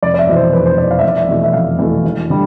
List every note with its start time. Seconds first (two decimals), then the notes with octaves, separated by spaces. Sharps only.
0.02 F1 D5
0.14 D5
0.19 E5
0.27 E2 B2
0.36 C5
0.53 F1 B4
0.66 C5
0.78 E2 B2 D5
0.91 F5
0.99 E5
1.03 F1 D5
1.17 E5
1.29 E2 B2 A3
1.44 E5
1.53 F1 F5
1.79 E2 B2 A3
2.04 E1
2.30 D3 G3